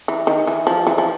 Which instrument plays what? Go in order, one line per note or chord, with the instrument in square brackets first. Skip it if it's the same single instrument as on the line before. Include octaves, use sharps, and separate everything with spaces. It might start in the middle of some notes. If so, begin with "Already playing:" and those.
[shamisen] E3
D#3
E3
F3
E3
F3